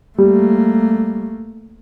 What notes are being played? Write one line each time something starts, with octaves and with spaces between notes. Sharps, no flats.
G3 A3 A#3